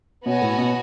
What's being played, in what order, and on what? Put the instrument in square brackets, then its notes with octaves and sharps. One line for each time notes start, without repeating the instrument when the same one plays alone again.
[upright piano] B2 [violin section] B3 F#4 C#5 G#5
[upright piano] A2
B2